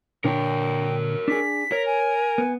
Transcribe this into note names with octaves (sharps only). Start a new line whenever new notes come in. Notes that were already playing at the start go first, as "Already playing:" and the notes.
A#2 D3 D4 A#4 C#5 G5
D4 G#4 B6
A#4 C#5
G#5
B3